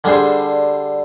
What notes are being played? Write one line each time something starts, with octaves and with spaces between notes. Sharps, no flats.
D3 G3 D4 G#4 C5